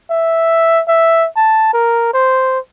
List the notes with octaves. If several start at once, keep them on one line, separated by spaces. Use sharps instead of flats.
E5
E5
A5
A#4
C5